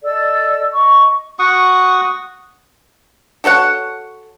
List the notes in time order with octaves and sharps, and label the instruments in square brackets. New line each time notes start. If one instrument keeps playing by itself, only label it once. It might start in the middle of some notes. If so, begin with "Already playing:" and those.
[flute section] A4 D5 D#5 E6
D#5 C#6
[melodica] F#4 F#5 C#6 D#6
[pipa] F#4 A4 C#5 F#5